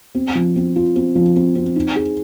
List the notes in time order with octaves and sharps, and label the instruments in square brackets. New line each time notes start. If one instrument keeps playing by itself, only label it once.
[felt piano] C4
F3
C4
F4
C4
F3
C4
C4
D#4
G#4